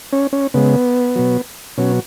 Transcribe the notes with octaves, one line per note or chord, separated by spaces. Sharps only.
C#4
C#4
C#3 G#3 B3
B2 F#3
B2 F#3 C#4